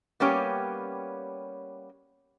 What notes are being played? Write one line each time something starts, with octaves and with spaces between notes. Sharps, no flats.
G3 A#3 B3 C#4 G4 C#5